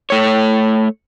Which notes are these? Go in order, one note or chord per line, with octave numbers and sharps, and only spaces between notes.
A3 C#5